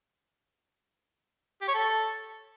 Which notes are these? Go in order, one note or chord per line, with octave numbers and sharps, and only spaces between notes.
G4
C#5
A4